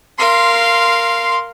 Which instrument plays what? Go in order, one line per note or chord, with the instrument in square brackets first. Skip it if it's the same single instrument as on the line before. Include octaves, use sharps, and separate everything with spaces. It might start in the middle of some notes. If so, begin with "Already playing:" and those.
[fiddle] A#4 F5 [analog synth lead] C6